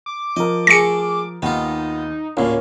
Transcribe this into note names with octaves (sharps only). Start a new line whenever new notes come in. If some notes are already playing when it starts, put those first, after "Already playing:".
D6
F3 A#4 D#5
A3 G#4 A#6 C#7
D#2 B3 D#4 F4
D2 A2 A#3 C#4 F4